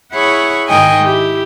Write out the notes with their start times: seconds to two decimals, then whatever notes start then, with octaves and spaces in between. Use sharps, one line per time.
0.14 E4 G#4 C#5 F#5 B5 C#6
0.67 G#2 D#3 G#3 D#5 G5 G#5
1.03 E4 G4